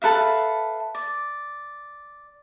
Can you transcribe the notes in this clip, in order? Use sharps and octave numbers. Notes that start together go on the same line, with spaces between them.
A4 B4 E5 F5
D5